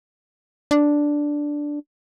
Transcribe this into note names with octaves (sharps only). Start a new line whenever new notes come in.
D4